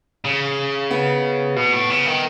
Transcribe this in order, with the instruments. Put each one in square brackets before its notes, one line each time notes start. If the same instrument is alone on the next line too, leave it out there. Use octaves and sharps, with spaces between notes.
[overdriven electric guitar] C#3
[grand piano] B3
[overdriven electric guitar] B2
A2
C#3
D#3